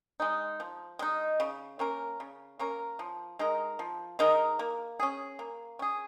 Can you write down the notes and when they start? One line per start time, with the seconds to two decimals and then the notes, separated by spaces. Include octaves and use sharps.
0.20 G#3 D#4
0.60 F3
0.99 G#3 D#4
1.40 C#3
1.79 A#3 C#4 A#4
2.20 C#3
2.59 A#3 C#4 A#4
2.99 F3
3.39 G#3 D#4 A#4
3.79 F3
4.19 G#3 D#4 A#4
4.59 A#3
5.00 C#4 G#4
5.39 A#3
5.79 C#4 G#4